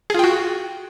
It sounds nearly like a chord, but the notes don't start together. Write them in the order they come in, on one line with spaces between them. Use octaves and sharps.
G#4 F4 G5 F#4